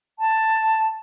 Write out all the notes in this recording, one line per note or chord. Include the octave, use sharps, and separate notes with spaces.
A5